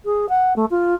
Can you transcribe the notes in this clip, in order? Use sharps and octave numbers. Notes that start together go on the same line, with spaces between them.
G#4
F#5
A3
F4